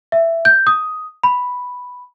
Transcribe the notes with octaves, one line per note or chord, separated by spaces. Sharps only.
E5
G6
D#6
B5